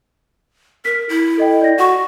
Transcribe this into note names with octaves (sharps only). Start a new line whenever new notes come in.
A#4 B6
E4
A4 D#5 G5
D5 A#6
F#4 F#5 C#6